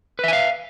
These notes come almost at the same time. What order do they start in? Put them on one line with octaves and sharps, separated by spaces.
B4 E5 G#5 F5